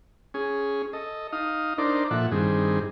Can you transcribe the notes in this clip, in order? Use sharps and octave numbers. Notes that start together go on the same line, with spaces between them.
C#4 G#4
A4 D#5
D#4 F5 D#6
D4 D#4 A#4 C5 D5
A#2 F3 A4 E5 F#5
G2 D#3 C4 G#4